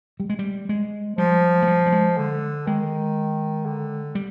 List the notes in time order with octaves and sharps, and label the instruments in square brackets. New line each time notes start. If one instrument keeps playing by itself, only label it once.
[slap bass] G3
G#3
G3
G#3
[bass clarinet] F3 [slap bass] G3
[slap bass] G#3
G3
G3
G#3
[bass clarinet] D3
[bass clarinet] D#3 [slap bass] G#3
[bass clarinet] D3
[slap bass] G3